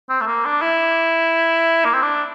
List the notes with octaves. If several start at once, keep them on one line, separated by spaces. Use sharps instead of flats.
C4
A3
A#3
D4
E4
A#3
C4
D4